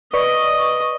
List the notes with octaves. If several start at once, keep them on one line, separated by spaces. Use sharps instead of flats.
B4 D5 D#5 C#6